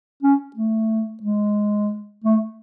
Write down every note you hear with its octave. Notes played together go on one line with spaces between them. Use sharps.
C#4
A3
G#3
A3